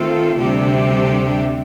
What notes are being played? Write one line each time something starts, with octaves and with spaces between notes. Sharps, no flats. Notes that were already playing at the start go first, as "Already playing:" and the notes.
Already playing: D#3 A3 C4 F4 A4
D2 C3 G3 D4 G4